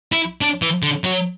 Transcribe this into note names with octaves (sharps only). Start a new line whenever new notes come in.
E4
D4
E3
D3
F#3